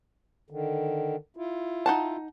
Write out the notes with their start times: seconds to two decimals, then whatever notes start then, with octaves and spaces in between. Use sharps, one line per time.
0.50 D3 D#3
1.37 E4 F4
1.86 D#4 F#5 A5